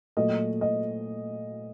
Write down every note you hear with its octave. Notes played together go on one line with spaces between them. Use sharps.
A#2 F#3 A3 D#5
D#5